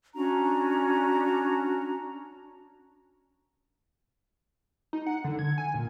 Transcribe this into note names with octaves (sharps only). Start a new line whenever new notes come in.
C#4 D4 F#4 A#5
D#4
F#5
D3
G#6
G#5
A#2